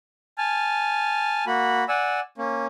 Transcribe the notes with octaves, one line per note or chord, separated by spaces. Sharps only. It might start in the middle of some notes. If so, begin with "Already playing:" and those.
G#5 A5 F6
A#3 F#4 B5
D5 F#5 G#5 E6
A#3 C#4